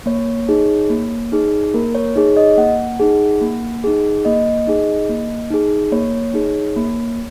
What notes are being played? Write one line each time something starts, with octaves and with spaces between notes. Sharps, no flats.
A#3 C#5
D#4 G#4
A#3
D#4 G#4
A#3 A#4
C#5
D#4 G#4 C#5
D#5
A#3 F#5
D#4 G#4
A#3
D#4 G#4
A#3 D#5
D#4 G#4
A#3
D#4 G#4
A#3 C#5
D#4 G#4
A#3